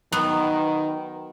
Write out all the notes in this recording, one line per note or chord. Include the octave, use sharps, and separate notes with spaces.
D#3 F#3 B3